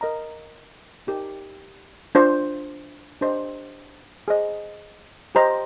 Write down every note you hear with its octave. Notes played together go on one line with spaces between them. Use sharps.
A#4 D#5 A#5
D#4 G4 A#4
D4 F4 C5
D4 G4 C5 D#5
G#4 C5 D#5
G4 C5 D#5 A#5